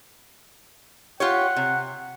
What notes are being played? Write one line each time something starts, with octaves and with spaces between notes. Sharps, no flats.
F4 G4 C#5 F#5
C3